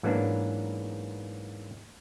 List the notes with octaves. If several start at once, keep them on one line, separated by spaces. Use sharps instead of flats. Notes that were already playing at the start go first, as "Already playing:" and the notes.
G#2 E3 F#3 A#3 B3 D4